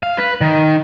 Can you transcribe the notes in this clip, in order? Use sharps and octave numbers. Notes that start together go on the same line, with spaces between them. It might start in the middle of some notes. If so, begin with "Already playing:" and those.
F5
B4
D#3